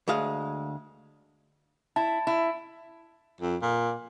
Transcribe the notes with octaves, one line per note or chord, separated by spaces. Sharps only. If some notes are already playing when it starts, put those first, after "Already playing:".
D2 G#3 G#4 F5
E4 A5
E4
F2
A#2